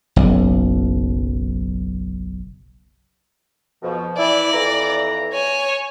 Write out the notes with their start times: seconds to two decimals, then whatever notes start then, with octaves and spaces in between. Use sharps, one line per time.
0.16 F#1 B1
3.82 F2 B2 F3
4.18 E3 E4 D5
4.53 F2 E3 A#5
5.33 C#5 G#5